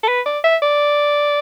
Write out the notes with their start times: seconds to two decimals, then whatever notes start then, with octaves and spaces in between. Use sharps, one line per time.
0.04 A4
0.08 B4
0.26 D5
0.44 E5
0.62 D5